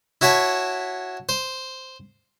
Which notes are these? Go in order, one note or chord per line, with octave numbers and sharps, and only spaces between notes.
E4 F#4 C#5 A5 B5
C5